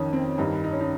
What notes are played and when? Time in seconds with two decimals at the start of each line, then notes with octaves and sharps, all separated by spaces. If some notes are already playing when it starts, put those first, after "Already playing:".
Already playing: F2 D#3 C#4 D#4
0.13 C4
0.38 G2 D#3 D#4
0.64 D#4
0.72 C#4
0.81 D#4